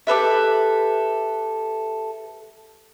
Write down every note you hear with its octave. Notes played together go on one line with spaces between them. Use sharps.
G4 A4 B4 E5